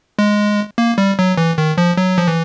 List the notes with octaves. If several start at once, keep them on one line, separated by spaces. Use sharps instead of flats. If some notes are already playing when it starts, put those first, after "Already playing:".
G#3
A#3
G3
F#3
E3
D#3
F3
F#3
F3
E3